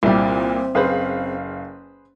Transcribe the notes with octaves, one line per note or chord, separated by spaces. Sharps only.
C2 A#2 G3 C4 E4
F#1 G#4 B4 C5 F5